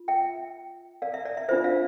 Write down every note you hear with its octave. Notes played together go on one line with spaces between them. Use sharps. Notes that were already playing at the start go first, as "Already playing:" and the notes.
Already playing: F4
E5 G5
D5 F5
E5
D5
E5
D4 F4 C5 E5
D5 F5